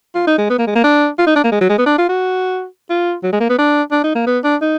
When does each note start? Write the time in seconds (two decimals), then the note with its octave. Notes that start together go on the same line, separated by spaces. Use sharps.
0.15 F4
0.27 D#4
0.38 G#3
0.50 B3
0.59 A#3
0.67 G#3
0.75 A#3
0.84 D4
1.19 F4
1.27 D#4
1.36 D4
1.44 A#3
1.52 G#3
1.61 F#3
1.69 G#3
1.78 B3
1.86 D4
1.98 F4
2.09 F#4
2.90 F4
3.23 F#3
3.33 G#3
3.40 A#3
3.49 B3
3.58 D4
3.92 D4
4.04 D#4
4.15 A#3
4.27 B3
4.44 D4
4.61 D#4